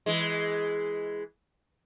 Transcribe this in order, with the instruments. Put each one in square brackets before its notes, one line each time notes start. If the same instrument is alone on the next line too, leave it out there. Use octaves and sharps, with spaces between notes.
[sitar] E3 G#3